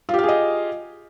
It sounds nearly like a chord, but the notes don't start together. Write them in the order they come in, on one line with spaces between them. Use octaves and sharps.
F4 G4 F5 G#4 D#5